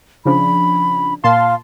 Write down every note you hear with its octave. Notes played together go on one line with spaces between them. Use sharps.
C#3 F3 D4 B5
A#2 F5 A5 C6